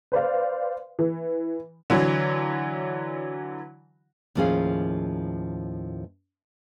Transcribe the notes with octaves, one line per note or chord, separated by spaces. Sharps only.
B4 C5 D5 F5
E3
D3 E3 F#3
D#2 A2 F3 C#4 G#4 F5